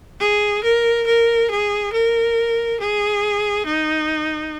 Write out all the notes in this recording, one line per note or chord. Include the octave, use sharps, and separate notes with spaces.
G#4
A#4
A#4
G#4
A#4
G#4
D#4